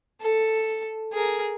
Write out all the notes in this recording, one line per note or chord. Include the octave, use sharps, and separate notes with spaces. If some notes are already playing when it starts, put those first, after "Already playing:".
A4
G#4 A#4